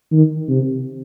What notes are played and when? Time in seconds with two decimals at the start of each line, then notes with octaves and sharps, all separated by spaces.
0.12 D#3
0.49 C3